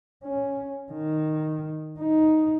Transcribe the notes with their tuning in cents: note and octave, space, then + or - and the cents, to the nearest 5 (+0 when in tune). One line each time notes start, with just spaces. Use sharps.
C#4 +0
D#3 -5
D#4 +5